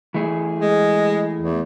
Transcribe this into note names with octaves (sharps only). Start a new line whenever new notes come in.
E3 A3 G#4
G#3
E2